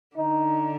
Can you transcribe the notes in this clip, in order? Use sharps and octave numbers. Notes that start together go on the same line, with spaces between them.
D3 D#4